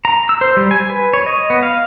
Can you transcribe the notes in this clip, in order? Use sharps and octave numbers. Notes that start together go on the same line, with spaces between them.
A#5
E6
C5
G3
G#5
B4
C#5
D#5
B3
F5